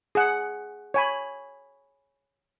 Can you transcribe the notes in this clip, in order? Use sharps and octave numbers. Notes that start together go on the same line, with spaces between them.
G#4 F#5
C#5 G#5 B5